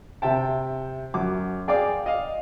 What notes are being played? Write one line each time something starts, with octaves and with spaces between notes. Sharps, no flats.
C3 E5 G5 A5
F#2 D6
G#4 D5 F5 G5 D6
D#5 F5